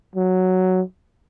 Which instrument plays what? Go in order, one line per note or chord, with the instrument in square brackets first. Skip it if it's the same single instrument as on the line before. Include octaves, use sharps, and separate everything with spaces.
[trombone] F#3